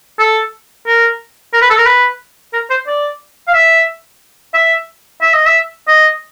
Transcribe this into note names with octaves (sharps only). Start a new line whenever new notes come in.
A4
A#4
A#4
B4
A4
A#4
B4
A#4
C5
D5
F5
E5
E5
E5
D#5
E5
D#5